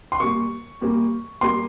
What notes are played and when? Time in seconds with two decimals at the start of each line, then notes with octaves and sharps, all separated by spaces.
0.12 C6
0.20 A#2 G3 A#3 C#6
0.81 A#2 G3 A#3
1.41 A#2 G3 A#3 C6